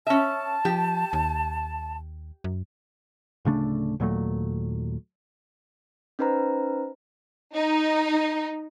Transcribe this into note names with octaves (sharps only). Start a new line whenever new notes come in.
C#4 E5 A5
F3 G4
D#2
F#2
D1 C#3 A3 D4
D#2 A#2 F#3 A3
C#4 D#4 B4 C5 A#5
D#4